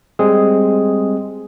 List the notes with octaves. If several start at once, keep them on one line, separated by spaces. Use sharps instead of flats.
G3 G#3 C4 G#4